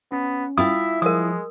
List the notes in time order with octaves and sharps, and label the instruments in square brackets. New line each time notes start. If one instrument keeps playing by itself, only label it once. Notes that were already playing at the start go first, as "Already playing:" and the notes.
[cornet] B3 [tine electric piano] C#4
[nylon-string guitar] E4 F4 G5 [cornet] E5 [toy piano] D#6
[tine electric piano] F3 [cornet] G#3 [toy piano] A#4 D#6